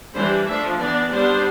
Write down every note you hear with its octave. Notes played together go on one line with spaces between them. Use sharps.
E3 G3 D4 C5
F3 A3 D4 E5
E3 B3 D4 D5
G3 B3 D4 C5